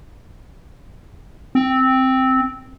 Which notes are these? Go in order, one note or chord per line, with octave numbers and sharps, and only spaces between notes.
C4